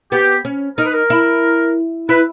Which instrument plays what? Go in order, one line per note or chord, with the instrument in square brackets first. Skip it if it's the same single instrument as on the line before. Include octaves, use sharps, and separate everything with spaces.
[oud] B3 [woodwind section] G4
[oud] C#4
[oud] D#4 [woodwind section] A#4
[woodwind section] B4
A#4
[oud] E4
[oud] E4 [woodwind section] B4